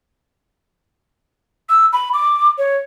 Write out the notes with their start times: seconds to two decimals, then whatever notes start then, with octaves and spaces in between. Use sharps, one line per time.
1.69 E6
1.93 B5
2.13 D6
2.58 C#5